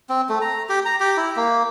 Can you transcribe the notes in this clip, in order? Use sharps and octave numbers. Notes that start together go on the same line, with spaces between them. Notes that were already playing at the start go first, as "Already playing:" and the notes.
C4
A3
A#5
G4
A#5
G4
E4
A#3